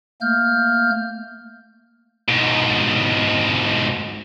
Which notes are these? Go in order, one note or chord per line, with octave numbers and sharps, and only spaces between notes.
A3 A#3 F6 G6
G#2 B2